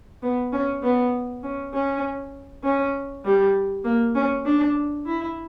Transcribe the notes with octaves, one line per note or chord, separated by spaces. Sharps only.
B3
C#4
B3
C#4
C#4
C#4
G3
A#3
C#4
D4
E4